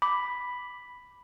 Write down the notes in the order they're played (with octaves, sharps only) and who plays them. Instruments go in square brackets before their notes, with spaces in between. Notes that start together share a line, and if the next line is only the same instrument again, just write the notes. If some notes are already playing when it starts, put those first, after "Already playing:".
[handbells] B5 [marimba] D6